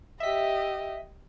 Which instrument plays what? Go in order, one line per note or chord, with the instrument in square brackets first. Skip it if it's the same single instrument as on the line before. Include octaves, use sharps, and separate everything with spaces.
[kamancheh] G4 D#5 [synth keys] E5 B6